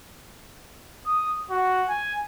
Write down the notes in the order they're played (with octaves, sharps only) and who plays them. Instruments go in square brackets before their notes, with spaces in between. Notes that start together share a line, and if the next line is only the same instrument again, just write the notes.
[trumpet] D#6
F#4
G#5